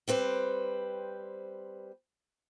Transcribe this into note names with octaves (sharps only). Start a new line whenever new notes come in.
G3 C4 B4 C5